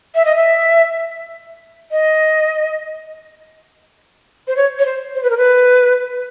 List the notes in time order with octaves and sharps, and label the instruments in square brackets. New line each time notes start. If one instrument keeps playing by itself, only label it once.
[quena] E5
D#5
E5
D#5
C5
C#5
C#5
C5
C5
B4
A#4
B4